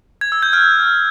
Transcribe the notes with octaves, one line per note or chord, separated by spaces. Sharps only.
G#6
E6
G6
F6